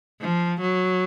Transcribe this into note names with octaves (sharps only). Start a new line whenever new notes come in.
F3
F#3